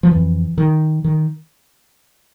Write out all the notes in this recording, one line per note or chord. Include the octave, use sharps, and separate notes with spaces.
F3
F2 D3 E3
D#3
D#3